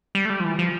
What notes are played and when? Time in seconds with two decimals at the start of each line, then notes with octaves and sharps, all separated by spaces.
0.15 G3
0.25 A3
0.30 G3
0.40 F3
0.44 E3
0.59 F3